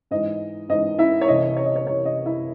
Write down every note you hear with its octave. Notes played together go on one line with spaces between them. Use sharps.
G#2 E3 D#5
G#2 E3 D#5
E4 E5
C#5
C2 C3 E3 D#5
C#5
D#5
C#5
C2 C3 E3 C#5
D#5
E4 E5